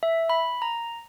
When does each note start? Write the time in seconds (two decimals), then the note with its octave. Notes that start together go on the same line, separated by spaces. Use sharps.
0.03 E5
0.30 B5
0.62 A#5